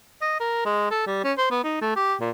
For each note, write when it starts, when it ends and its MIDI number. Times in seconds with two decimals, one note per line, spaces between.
0.22 0.38 75
0.40 0.62 70
0.65 0.90 56
0.91 1.06 69
1.06 1.22 55
1.24 1.33 61
1.38 1.47 72
1.51 1.62 59
1.64 1.78 63
1.82 1.95 57
1.96 2.14 67
2.21 2.30 46